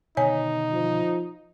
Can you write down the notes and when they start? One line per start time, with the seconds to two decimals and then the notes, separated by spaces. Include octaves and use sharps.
0.17 B2 D3 D#3 D#4 C#5 G#5
0.72 F3